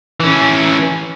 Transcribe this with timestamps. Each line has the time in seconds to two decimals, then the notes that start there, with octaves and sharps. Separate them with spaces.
0.20 E3 C#4